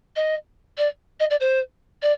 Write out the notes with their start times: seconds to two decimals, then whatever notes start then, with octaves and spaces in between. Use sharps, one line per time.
0.16 D#5
0.77 D5
1.20 D#5
1.30 D5
1.40 C5
2.02 D5